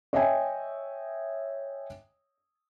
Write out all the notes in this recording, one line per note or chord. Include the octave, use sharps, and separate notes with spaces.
C#5 D#5 E5 G5 G#5